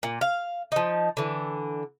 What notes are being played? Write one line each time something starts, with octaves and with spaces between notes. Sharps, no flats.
A#2
F5
F3 D#4
D3 E3